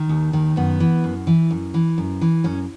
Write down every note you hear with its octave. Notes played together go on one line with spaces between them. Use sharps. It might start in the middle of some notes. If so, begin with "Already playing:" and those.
Already playing: D#3
D#2
D#3
F#2 B3
E3
F#2
E3
F#2
E3
F#2
E3
F#2 C#4